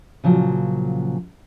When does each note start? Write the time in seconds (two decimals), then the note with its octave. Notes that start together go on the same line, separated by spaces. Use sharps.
0.24 A#2 C#3 F3 F#3